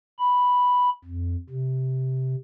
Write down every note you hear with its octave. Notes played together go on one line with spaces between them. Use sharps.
B5
F2
C3